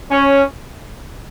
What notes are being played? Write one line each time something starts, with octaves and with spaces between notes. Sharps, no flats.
C#4